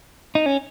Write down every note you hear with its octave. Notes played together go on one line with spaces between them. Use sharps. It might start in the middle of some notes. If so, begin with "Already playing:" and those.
D#4
C#4